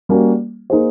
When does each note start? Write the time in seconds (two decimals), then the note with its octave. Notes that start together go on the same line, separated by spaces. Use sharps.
0.09 G3 A#3 C#4 F#4
0.70 A#3 D#4 G#4 C5